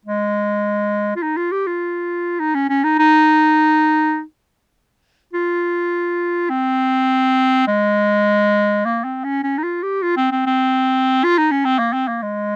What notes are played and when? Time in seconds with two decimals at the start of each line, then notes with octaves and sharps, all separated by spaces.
0.05 G#3
1.16 F4
1.23 D#4
1.37 F4
1.52 G4
1.67 F4
2.40 D#4
2.55 C#4
2.69 C#4
2.84 D#4
2.99 D#4
5.33 F4
6.50 C4
7.68 G#3
8.85 A#3
9.05 C4
9.24 C#4
9.44 C#4
9.58 D#4
9.64 F4
9.83 G4
10.02 F4
10.17 C4
10.32 C4
10.46 C4
11.24 F4
11.38 D#4
11.51 C#4
11.65 C4
11.79 A#3
11.93 C4
12.08 A#3
12.22 G#3